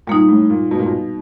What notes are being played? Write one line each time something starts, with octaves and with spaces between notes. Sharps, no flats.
A#2 G3 A#3 D#4
A2
A#2
B2
A#2
B2